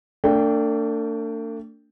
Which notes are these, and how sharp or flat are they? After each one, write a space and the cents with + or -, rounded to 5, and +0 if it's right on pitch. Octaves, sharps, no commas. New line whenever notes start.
A3 +45 D4 -10 G5 +0